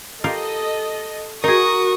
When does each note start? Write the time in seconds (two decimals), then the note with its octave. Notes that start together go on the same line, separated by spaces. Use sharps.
0.24 F4 G4 A4 A#4 D#5
1.44 D#4 F#4 G#4 A#4 C#6 D#6